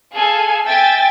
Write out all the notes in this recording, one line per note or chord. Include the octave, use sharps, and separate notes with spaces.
G#4 A4 F5 G#5
E5 G5 G#5 A6